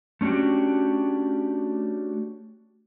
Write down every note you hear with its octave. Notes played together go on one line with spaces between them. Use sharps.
A3 C#4 D4 F#4 G4